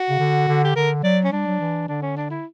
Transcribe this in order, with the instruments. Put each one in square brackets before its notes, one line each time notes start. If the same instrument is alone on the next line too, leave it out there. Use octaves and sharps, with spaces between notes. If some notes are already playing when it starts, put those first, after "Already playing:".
Already playing: [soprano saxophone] F#4
[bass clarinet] C#3
D3
D3
[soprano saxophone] G4
[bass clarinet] D3 [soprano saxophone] A#4
[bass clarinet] F#3 [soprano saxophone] D5
[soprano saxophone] C#4
[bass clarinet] G3 [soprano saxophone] D4
[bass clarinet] F#3
E3
[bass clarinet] D3 [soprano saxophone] D4
[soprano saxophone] C#4
D4
E4